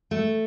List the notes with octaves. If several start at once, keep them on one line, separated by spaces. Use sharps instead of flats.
A3